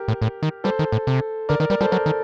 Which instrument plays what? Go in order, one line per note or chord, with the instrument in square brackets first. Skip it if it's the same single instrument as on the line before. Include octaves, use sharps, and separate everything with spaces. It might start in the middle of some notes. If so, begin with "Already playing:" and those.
Already playing: [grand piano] G4 A#4
[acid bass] A2
A2
D#3
[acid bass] G3 [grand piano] A4 C5
[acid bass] D#3
A2
C3
[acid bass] D3 [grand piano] A#4 D5
[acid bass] D#3 [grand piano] A#4 D5
[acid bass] G3 [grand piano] A#4 D5
[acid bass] G3 [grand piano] A4 C5
[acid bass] F#3 [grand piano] A#4 D5
[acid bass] D#3